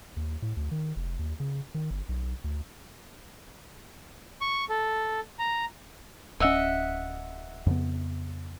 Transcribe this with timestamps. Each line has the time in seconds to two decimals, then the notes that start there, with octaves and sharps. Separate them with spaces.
0.17 D#2
0.42 A2
0.57 D2
0.71 D#3
0.96 F1
1.19 D#2
1.40 C#3
1.74 D#3
1.90 G1
2.09 B1
2.44 D2
4.41 C#6
4.69 A4
5.39 A#5
6.40 D1 C#4 D#5 E5 F#5
7.66 F2 C#3 B3